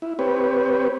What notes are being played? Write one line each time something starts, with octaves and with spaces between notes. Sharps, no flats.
E4
C4 G4 B4 C#5